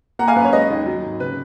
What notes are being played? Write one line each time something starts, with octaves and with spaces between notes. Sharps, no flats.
A#3 F#5 A#5
F5 G#5
F#2 B4
C#5
G#3 B4 D#5
D#2
F#3
G#1
C#3 B4